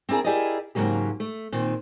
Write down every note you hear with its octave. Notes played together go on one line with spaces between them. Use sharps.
C4 D4 E4 G#4 A#4
E4 G4 G#4 A#4 D5 D#5
G#2 C#3 F#3 A#3 G4
A3
A#2 D#3 C4